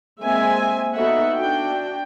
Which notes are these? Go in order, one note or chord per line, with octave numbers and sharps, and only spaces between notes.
G#3 A#3 C4 E5 G#5
B3 D#4 F#4 A4 E5 F#5
D4 F#4 G5